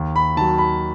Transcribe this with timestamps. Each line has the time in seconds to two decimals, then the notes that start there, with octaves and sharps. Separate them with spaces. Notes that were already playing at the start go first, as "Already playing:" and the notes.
Already playing: D#2
0.16 B5
0.36 D#3 A5
0.41 F#3
0.58 B5